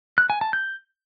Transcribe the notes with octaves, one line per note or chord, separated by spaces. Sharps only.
F#6
G#5
A5
G6